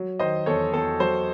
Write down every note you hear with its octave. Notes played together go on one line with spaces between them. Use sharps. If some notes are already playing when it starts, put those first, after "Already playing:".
Already playing: F#3
D#3 C5 D#5
E2 A4 C#5
E2 A4
F#3 C5